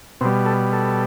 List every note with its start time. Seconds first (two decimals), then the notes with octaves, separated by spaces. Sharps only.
0.21 B2 G3 C4
0.46 A4
0.73 A4